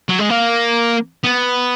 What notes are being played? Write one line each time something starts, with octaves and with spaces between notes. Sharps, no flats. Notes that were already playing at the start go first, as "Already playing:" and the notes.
F#3
G#3
A#3
B3